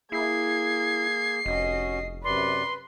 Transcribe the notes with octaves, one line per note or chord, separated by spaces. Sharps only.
A#3 E4 G#4 G#6 C7
F1 C#4 F#4 D#5
F#2 C3 B4 D5 C6